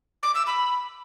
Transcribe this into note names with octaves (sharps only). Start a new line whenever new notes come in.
D6
E6
B5